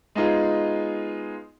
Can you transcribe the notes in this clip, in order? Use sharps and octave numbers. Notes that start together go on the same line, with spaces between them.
G#3 B3 D#4 F4 G#4